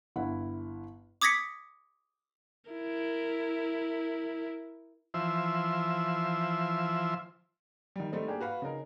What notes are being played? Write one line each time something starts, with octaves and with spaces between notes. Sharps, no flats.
G1 E4 F#5
D6 D#6 G#6 A#6 B6 C#7
E4 A#4
E3 F3 C5 E5
D#3 G3
G3 A3 C4 D#4
A#3 D4 G4 G#4
F#4 B4 F5
C#3 D#4 A#4